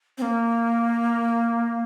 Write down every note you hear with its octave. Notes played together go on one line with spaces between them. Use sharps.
C4
A#3